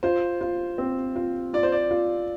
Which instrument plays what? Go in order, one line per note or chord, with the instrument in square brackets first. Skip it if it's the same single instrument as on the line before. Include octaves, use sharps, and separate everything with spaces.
[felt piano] F4 [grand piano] C5
[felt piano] F4
C4
F4
[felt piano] F4 [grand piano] D5
[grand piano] C5
D5
[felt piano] F4